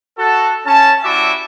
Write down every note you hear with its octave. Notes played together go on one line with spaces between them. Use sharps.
F#4 A4
C#4 A5
G3 C#4 E4 F#4 E5 D6